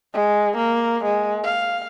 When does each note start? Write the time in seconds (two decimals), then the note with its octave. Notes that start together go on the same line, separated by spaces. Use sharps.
0.14 G#3
0.57 A#3
1.05 G#3
1.45 F5